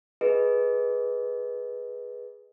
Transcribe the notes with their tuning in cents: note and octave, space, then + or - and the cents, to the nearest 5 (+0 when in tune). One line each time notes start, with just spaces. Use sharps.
G#4 +0 B4 -10 D#5 +0